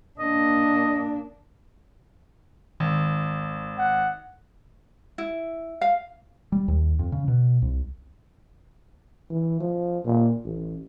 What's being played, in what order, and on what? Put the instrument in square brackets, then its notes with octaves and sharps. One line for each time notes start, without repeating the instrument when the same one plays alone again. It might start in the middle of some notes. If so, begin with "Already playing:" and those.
[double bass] A#3 D4 [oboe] D#5
[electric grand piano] G#1 [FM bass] D#3
[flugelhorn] F#5
[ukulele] E4
F5
[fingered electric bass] G3
D#2
F2
C#3
B2
C2
[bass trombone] E3
F3
A#2
A1